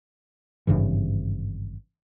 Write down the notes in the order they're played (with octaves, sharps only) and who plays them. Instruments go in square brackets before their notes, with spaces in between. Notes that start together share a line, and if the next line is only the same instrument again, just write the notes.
[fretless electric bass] G#1 G2 C#3 E3